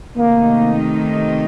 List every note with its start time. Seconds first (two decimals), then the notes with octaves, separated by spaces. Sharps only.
0.16 C3 D#3 A3 A#3 D#4